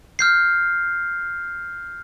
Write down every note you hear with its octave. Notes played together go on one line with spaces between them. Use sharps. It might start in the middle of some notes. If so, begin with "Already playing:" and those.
F6 G6 C7